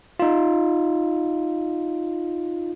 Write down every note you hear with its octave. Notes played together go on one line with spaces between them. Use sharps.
D#4 F4